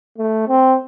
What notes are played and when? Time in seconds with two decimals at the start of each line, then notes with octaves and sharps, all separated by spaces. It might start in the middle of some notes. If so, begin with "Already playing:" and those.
0.19 A3
0.48 C4